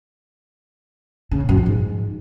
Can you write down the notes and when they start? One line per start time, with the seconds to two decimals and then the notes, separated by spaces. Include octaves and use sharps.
1.31 C#3
1.40 A#2
1.49 F#2
1.57 F3
1.66 G#2